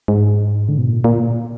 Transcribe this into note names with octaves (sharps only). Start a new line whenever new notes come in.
G#2
D3
B2
A#2
A#2